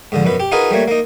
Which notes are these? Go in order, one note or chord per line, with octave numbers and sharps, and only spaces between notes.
G#2 D3 F3
F#2 B2 B4
G4
D#4 F4 F#4 G#4 A#4 B4
G3 A3 A#3 C#5
A#3 D#4